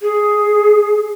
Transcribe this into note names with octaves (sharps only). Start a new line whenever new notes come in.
G#4